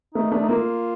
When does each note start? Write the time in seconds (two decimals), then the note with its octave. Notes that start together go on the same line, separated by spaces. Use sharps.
0.15 A3 D#4
0.31 A3 D4
0.43 D#4
0.49 A#3 F4